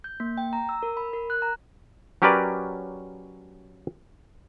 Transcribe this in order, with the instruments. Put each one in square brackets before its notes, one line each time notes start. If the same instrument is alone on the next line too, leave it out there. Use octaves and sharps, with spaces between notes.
[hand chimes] G6
A#3
G5
A#5
E6
A#4
B5
A#4
F#6
A#5
[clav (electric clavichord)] F#3 C#4 G4 A#4 B4 D5